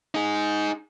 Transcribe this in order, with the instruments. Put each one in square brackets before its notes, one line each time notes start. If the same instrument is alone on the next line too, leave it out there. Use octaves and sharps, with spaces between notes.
[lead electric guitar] D#4 G#4